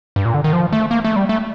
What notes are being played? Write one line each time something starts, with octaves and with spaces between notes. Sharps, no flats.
G2
A#2
D3
D#3
F3
A3
A#3
A3
G3
A3